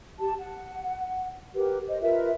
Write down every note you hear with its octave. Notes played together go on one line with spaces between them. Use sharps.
G4 A5
F#5
G4 A#4 B4
C5 D#5
F4 A#4 B4 E5